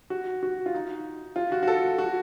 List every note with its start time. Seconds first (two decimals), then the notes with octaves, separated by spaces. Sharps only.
0.10 F#4
0.43 F#4
0.66 F4
0.74 D#4
1.36 F4
1.52 F#4
1.63 F#4
1.68 A4
1.98 F#4